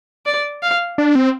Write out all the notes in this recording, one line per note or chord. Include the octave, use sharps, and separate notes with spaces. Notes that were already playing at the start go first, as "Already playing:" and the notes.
D5
F5
D4
C4